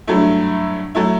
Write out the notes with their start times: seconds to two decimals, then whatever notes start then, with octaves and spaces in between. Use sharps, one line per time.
0.07 G2 F#3 A3 E4
0.95 F#3 A3 E4